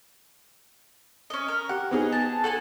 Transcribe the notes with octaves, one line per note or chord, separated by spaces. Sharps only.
C#4 D#5
A#4
G4 F#5
B3 D#4 G#4
A5
A4 F#5 G#5 A5